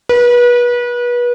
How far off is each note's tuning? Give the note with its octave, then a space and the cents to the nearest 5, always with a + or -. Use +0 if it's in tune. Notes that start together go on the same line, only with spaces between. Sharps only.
B4 -30